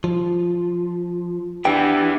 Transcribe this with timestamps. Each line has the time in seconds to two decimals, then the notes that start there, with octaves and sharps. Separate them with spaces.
0.04 F3
1.65 E3 B3 D4 G4 G5